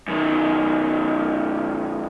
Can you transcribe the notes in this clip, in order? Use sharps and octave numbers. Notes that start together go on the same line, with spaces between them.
F#2 D#3